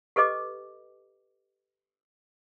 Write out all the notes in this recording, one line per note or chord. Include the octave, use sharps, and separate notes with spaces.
G4 A4 B4 D#5 D6